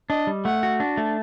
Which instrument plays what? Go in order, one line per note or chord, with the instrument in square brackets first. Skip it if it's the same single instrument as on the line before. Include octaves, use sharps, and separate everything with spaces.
[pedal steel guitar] D4 [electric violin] D#5
[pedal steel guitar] G3
[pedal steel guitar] A3 [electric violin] F#5
[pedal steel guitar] F#4
D4
A3